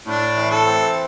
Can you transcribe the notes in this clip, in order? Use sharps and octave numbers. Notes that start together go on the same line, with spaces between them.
A2 D4
E3
A4
C4